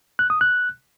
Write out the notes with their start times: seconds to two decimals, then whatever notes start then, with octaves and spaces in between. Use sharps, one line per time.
0.19 F#6
0.30 D#6
0.41 F#6